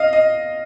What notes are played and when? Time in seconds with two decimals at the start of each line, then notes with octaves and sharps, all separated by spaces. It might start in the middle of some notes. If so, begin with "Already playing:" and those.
Already playing: D#5 F5
0.13 D#5